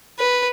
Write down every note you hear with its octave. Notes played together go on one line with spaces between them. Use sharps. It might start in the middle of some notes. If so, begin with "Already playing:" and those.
B4